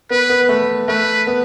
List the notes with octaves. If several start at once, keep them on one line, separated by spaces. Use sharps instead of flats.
B3 B4
B3
A3
A3 B4
B3